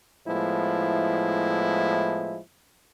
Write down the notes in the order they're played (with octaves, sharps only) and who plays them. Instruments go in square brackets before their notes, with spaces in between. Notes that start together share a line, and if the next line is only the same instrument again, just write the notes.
[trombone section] A2 F3 G#3 B3 E4